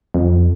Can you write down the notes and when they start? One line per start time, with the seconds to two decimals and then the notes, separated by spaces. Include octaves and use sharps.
0.14 F2